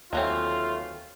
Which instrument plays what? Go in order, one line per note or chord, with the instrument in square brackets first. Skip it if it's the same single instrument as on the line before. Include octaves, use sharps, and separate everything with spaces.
[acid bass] D#2 [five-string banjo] E3 F#3 C4 [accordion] A3 [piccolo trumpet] F4